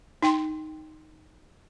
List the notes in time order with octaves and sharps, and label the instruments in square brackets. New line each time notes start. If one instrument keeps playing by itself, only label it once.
[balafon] D#4 G5 C6